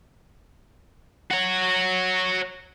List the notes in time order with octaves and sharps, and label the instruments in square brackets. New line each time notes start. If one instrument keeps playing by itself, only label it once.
[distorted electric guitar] F#4 C#5